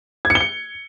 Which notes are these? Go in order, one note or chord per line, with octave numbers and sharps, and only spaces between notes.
G#6
C#7
G7
C#7